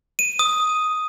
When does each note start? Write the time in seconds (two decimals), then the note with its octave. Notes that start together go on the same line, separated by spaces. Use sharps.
0.19 D#7
0.39 D#6